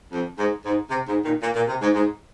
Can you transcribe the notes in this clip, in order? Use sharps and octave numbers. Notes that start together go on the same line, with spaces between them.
F2
G#2
G#2
C3
G#2
A#2 D#3
A#2
A#2
C3
G#2
G#2